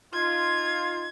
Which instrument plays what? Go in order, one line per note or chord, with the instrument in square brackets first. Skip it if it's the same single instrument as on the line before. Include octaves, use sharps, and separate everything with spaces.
[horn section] D#4 F4 [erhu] G#6